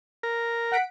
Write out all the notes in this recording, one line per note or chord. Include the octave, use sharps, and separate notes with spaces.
A#4
F#5 B6 D7